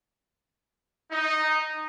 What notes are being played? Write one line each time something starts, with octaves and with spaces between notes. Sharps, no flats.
D#4